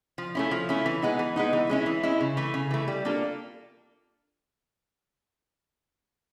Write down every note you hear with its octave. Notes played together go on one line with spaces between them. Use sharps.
F3
A3 C#4 E4
F3
A3 C#4 E4
E3
G#3 B3 D#4
E3
G#3 B3 D#4
E3
G#3 C#4 E4
E3
G#3 C#4 E4
C#3
E3 A3
C#3
E3 A3
G3
A#3 D4 F4 A4